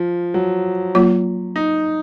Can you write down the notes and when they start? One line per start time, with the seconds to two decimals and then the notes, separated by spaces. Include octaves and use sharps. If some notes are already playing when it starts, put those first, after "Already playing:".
Already playing: F3
0.34 F#3
0.95 F#3 A#3 F4
1.56 D#4